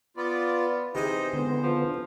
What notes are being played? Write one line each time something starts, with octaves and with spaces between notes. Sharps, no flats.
B3 F4 D5
C3 E3 D#4 G#4 C5
D3 G#3 B3
F3